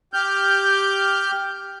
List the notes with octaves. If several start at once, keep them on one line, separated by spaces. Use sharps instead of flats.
G4 F6 G6